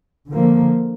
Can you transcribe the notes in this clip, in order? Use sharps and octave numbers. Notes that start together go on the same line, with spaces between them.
D3 F3 A#3